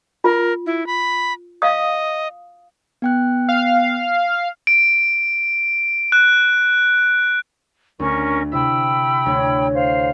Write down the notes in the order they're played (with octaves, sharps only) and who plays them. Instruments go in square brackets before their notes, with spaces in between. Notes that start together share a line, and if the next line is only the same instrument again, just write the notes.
[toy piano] F4 [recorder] A#4
[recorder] E4
B5
[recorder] D#5 [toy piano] F5 D#6
[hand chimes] B3 G5 F#6
[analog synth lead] F5
[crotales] D7
F#6
[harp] D2 [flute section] C#4 A#4 C#6
[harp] C3 E4 E5 [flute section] G5 B5 E6
[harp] D2 C#5 G#6
[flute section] C5 F5